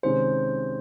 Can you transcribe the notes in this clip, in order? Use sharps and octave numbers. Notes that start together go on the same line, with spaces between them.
C3 D#3 G#3 C#4 G#4 C5